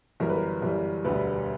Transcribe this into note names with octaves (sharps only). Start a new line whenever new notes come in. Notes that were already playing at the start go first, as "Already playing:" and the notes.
G1 F#2 E3 G3 A#4
B4
A#4
G1 F#2 E3 G3
E1 D2 D3 G3 B4